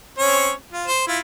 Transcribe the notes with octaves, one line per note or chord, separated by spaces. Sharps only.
C4 C#4 C#5
F4
C5
E4 F4